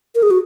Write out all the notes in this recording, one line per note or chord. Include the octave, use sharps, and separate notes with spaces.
A#4
G#4
F#4